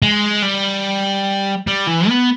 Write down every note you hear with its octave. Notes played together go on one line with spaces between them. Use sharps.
G#3
G3
G3
E3
B3